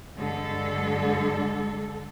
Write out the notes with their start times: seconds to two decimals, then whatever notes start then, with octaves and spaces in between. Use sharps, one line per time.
0.16 G2 D3 G#3 A4